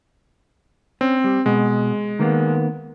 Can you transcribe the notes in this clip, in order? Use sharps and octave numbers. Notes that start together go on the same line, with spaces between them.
C4 C#4
G3
B2 G#3
D#3 A#3 B3